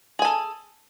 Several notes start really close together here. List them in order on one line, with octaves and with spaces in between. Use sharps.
G#4 G#5 A4